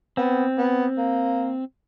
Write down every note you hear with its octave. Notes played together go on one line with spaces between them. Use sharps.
B3 C4
B3
A#3